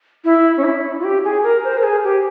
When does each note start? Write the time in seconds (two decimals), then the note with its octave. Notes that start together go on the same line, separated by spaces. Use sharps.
0.25 E4
0.57 C#4
0.64 E4
0.99 F4
1.04 G4
1.24 G#4
1.43 A#4
1.64 C5
1.77 A#4
1.83 G#4
2.04 G4